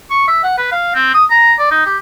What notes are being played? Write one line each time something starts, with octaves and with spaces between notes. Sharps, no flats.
C#6
E5
F#5
B4
F5
C4
D#6
A#5
D5
D#4
G4